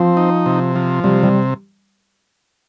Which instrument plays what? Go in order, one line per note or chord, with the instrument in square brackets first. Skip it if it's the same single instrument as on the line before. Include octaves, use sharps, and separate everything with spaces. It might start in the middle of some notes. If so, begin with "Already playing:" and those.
Already playing: [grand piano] F3 [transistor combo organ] C4
[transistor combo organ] D#4
C3
F3
[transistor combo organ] C3 [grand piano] G3
[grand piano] G3